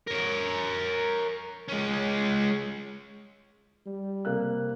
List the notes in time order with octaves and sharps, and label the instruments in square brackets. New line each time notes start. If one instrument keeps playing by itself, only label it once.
[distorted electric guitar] A#4 C#5
G#3 C#4
[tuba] G3
[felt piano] C3 A#3 F#6